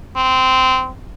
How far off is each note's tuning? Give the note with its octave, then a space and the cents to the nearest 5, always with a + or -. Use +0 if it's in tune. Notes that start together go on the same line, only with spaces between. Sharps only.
C4 -15